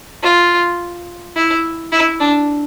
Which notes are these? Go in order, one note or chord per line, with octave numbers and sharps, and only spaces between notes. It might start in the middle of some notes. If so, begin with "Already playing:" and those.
F4
E4
E4
D4